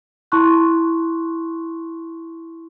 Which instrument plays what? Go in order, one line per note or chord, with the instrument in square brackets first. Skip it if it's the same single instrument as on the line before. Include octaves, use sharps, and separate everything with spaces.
[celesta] E4 A5 C6 C#6 F#6